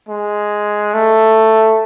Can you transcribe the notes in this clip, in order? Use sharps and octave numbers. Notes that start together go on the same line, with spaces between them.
G#3
A3